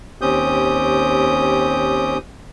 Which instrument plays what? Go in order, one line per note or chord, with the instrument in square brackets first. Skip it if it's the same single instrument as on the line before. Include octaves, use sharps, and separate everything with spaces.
[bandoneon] D#2 C4 C#4 G4 D#6 G6